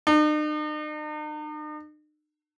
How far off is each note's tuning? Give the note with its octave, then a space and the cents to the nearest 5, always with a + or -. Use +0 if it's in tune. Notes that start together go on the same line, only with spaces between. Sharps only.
D#4 -45